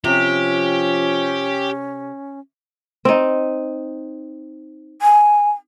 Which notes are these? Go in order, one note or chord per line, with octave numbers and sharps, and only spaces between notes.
C3 F3 C#4 G4
C4 D#4
G#5